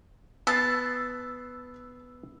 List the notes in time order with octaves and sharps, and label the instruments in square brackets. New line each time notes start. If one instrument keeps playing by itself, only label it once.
[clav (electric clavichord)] B3 [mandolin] A5 [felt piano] E6 F#6 C7